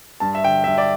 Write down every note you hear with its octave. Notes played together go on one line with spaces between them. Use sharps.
G2 A5
E5
D3 G5
G2 E5
D5